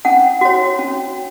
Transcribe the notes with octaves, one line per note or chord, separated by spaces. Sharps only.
C#4 F#5
F#4 C#5
C#4